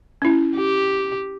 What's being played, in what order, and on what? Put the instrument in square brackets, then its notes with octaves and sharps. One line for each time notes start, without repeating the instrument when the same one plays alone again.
[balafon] C#4 E4
[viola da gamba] G4